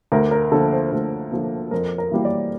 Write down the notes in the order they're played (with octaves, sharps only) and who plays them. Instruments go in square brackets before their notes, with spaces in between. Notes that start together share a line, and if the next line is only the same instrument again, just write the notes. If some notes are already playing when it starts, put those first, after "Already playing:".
[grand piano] D2 A#4
A#4
D3 F3 A#3 A4
C5
D2
D3 F3 A#3
F2 A#4
A#4
E3 G3 A#3
D5